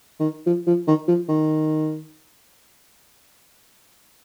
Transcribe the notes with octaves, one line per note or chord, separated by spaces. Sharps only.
D#3
F3
F3
D#3
F3
D#3